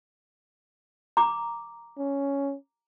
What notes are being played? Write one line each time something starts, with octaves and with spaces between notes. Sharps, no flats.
A#5 D6
C#4